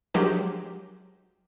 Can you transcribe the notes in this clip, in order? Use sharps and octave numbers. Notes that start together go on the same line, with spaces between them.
F3 F#3 G#3 D4 G4 A#4